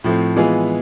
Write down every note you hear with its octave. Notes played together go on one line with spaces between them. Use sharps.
A2 F3 A3 C4
E3 G#3 B3 F4 G#4